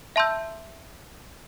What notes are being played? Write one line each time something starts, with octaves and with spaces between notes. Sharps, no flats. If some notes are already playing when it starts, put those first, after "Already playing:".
E5 A5 C6 E6 G6